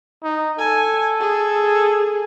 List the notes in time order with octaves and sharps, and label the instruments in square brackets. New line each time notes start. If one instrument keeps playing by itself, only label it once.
[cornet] D#4
[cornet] A4 [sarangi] G#5
[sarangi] G#4